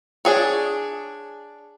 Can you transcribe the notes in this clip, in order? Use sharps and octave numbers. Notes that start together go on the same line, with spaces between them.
D4 G#4 C#5